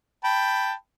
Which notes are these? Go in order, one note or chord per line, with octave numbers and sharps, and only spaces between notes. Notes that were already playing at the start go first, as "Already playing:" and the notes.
G5 A5 B5